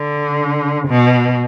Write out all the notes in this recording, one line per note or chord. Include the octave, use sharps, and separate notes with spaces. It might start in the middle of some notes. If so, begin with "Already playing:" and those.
Already playing: D3
B2